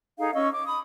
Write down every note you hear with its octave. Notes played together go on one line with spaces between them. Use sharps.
D#4 G#4 A4 F5
C#4 D#5 C#6 E6
D6
B5 D#6